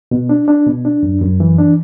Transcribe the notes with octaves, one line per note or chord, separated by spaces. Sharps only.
B2
D4
D4
B2
D4
F#2
F#2
E3
D4